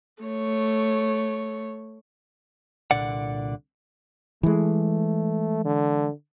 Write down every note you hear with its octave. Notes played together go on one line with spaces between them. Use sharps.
A3 C#5
C2 A#2 D3 D5 F#5
E3 G#3 A3
D3